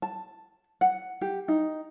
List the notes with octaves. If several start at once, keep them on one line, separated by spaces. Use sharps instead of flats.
A5
F#5
G4
D#4